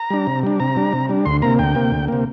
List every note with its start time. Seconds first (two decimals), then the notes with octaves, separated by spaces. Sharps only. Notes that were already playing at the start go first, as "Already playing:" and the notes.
Already playing: A#5
0.10 G3 D4
0.27 C3
0.43 G3 D4
0.60 C3 A#5
0.76 G3 D4
0.93 C3
1.09 G3 D4
1.25 D2 C6
1.42 C3 A#3 A#5
1.59 D2 G5
1.75 C3 A#3
1.92 D2
2.08 C3 A#3